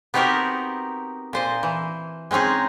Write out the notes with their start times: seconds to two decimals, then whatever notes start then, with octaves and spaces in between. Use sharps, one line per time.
0.14 B3 C4 D#4 F#4 G4 A#4
1.33 A#2 C5 D#5
1.63 E3
2.31 G#3 C4 C#4 D#4 G#4